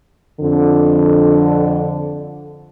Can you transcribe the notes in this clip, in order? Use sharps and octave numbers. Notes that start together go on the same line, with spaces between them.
F2 D3